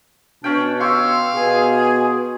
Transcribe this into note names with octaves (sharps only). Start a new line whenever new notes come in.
B2 C#4 D4 G5
G4 C#5 F5 C6 E6
B2 G#4